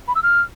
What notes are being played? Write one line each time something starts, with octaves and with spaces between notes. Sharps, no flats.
B5
E6
F6